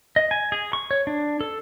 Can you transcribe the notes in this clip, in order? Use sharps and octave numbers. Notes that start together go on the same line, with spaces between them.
D#5
G#5
G#4
C#6
C#5
D4
A4